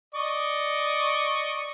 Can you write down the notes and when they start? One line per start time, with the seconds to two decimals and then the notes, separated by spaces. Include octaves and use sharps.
0.14 D5 D#5 C#6